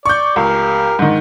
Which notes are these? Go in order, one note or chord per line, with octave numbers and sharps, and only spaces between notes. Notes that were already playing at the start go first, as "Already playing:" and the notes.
D5 C#6 G6
C#2 G4 A#4
G#2 D#3